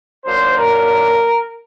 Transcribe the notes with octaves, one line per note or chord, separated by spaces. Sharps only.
D#3 F#3 A#3 D4 C5
A#4